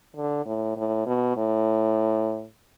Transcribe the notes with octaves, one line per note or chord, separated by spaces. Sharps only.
D3
A2
A2
B2
A2